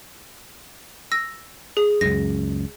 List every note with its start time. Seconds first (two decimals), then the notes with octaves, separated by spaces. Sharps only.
1.12 E6 A#6
1.77 G#4
2.01 C#2 F#2 A#6